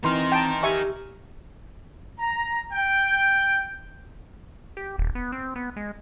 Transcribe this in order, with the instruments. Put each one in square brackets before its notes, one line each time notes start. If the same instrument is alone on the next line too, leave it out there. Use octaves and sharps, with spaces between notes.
[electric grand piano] E3 C6 [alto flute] C4 [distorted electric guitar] D#4 A#4
[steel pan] G5 A5
[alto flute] G4 [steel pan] E5 G#5 C#6
[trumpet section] A#5
G5
[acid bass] G4
D#1
B3
C4
B3
G#3